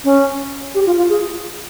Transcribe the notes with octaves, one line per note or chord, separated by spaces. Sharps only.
C#4
G4
F4
F4
G#4